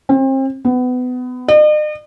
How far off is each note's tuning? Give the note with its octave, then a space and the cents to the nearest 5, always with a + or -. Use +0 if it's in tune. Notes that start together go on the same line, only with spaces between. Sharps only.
C4 +35
B3 +25
D#5 -45